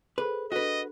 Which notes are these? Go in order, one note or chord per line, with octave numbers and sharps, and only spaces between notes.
G#4 A4 B4 C5
D4 F#4 A4 B4 D#5